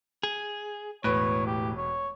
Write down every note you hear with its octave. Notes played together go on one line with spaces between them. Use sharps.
G#4
E1 A2 B4 C#5 F#6
G4
C#5